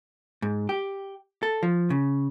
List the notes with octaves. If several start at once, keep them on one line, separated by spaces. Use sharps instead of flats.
G#2
G4
A4
F3
C#3